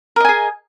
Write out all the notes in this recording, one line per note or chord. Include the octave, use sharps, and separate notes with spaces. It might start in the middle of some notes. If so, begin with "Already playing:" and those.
G#4 A#4 D#5 G#5